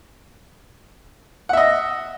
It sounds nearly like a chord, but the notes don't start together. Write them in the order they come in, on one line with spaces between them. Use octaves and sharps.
F#5 E5 D#5